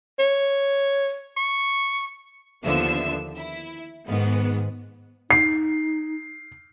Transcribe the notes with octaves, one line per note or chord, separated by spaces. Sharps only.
C#5
C#6
D#2 D3 F3 B3 E5 E6
E4
G#2 D#3 B3
D#4 C7